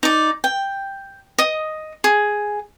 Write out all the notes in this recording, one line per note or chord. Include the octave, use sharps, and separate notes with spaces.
D#4 D5
G5
D#5 D#6
G#4